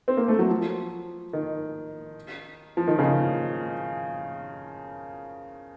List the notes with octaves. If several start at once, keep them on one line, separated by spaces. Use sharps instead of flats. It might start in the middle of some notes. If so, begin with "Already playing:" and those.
C4
A#3
A3
F#3
F3
D#3
F3
D#3
C#3